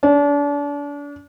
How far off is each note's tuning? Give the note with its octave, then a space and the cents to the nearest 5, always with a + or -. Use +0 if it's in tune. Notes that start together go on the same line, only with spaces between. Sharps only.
D4 -35